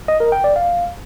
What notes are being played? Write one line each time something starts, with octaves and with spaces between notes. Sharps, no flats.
D#5
A#4
G5
D5
F5